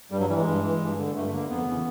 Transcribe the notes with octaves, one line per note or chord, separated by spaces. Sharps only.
G2 G3
F#3
E3 G3
G#3
G2
E3
G2
D3
G2 A3
A3
D3 A#3
F2 B3
C#3 E3